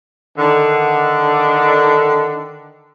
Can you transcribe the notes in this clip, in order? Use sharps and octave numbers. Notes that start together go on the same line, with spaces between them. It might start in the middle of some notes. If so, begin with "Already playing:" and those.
D3 D#3 D4